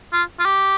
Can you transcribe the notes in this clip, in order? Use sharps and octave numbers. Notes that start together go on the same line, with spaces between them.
F4
F4
G4